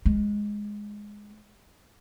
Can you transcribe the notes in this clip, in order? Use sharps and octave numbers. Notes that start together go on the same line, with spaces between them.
G#3